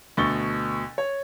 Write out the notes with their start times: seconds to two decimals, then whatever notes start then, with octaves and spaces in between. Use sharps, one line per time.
0.17 D2 B2 C#6 A6 G7
0.98 C#5